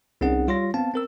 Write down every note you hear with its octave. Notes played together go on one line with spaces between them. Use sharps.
C2 C4 C#4 D#4 G#4 F#5
G3 F4 C#5 C6 A#6
B3 C4 F5 A5
C4 A#4 E6